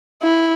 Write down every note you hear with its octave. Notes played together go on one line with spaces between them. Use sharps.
E4